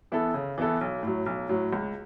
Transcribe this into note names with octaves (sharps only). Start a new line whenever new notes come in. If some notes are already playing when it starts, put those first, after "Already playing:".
E3 B3 E4 A4
C#3
E3 B3 E4 A4
B1
A2 F#3
B1
A2 F#3
C#2